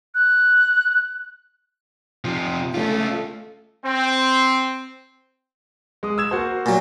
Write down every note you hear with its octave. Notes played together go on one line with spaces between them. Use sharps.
F#6
C3 F3
A3 C#4 F4 A4
C4
G#3 D#6
E6 G#6 E7
A#3 F#4 C5
A#2 F#3